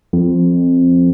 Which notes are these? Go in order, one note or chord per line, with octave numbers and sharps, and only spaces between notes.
F2